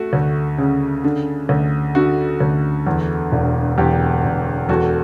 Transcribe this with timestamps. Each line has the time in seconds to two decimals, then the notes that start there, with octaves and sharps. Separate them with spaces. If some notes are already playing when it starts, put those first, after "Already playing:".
Already playing: A3 F#4 A4
0.13 D2
0.58 C#3
1.04 D3
1.49 D2
1.95 D3 F#4
2.40 D2
2.87 E2
3.32 E1
3.78 E2 G4
4.24 E1
4.69 E2 F#4 A4